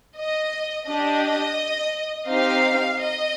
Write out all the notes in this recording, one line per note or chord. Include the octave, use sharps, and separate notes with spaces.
D#5
D4 G4 D#5
C4 D#4 G4 F5
D#5